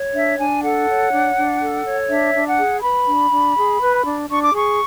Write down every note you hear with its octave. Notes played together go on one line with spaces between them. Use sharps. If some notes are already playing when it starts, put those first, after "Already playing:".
Already playing: C#5
D4 E5
D4 G#5
A4 F#5
C#5
D4
D4
A4
C#5
D4 E5
D4
F#5
G#4
B4 B5
D4
D4
G#4
B4
D4
D4 C#6
D6
G#4 C#6